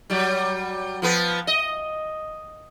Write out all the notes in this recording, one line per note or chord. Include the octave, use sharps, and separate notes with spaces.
F#3 G3
F3 B3 B4
D#5